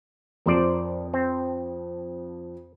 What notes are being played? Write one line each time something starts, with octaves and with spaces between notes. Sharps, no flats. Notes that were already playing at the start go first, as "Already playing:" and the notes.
F2 F3 A#4 C5 D5
C4